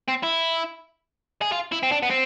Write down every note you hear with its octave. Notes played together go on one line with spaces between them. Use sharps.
C4
E4
G#4
F4
E4
C4
D4
B3
C4